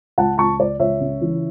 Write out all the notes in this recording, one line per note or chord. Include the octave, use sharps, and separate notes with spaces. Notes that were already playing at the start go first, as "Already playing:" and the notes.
C#2 F#5 A5
C#2 A5 C#6
C#2 D5
C#2 C#5 E5
C#3
E3